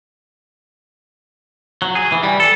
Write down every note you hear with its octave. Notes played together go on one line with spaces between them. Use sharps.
F#3
G#4
E3
G3
A4